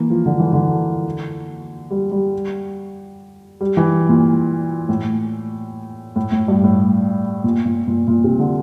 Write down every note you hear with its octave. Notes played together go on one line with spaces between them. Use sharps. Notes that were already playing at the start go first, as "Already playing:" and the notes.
Already playing: E3 A#3
F3
D3
E3
D3
G3
G3
G3
E3
A#2
A2
A2
A2
G2
A2
A#2
A#2
A#2
A#2
C3
D3